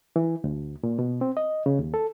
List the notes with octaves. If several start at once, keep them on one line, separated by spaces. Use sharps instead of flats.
E3
D2
A#2
B2
C4
D#5
C#3
D#2
A4